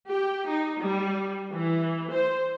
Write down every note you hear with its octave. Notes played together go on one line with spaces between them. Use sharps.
G4
D#4
G3
E3
C5